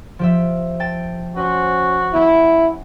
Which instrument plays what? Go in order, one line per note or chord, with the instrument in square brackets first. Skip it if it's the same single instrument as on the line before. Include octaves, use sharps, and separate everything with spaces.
[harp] F3 G4 E5
G5 A5 A6
[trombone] C#4 [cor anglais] F#4 [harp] B4 C5
[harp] B3 C#4 G4 [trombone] E4